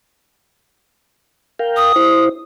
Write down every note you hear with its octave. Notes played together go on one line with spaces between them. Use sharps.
A#4 F5 G5
D#6
E4 C5